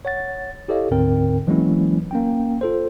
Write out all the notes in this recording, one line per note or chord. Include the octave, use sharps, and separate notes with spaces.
C#5 F#5 A6
E4 G4 A4 C#5 D#5 F5
D2 G#2 D3 C4 A#4 G5
E3 F#3 G#3 A#3 C#4 E4
A#3 C#4 G5
F4 A4 C5